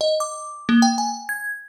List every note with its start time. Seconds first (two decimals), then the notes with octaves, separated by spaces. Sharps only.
0.01 D#5
0.20 D6
0.69 A#3
0.82 G5
0.98 G#5
1.29 G#6